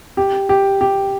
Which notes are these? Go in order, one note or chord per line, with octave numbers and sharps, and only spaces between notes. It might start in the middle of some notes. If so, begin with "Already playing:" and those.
G4
G4
G4